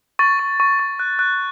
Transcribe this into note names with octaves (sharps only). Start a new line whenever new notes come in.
C#6 A6
C#6
C#6
C#6
F#6
F#6